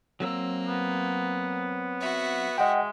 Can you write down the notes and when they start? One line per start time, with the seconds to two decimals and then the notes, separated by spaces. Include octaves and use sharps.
0.20 F#3 A#3 C4 E6
0.68 B3
2.01 F#4 E5
2.58 G#3 D#5 F#5 G5